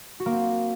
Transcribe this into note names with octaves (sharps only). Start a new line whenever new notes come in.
F#4
A#3
C4